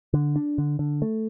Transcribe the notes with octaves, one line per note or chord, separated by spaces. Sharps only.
D3
D4
D3
D3
A3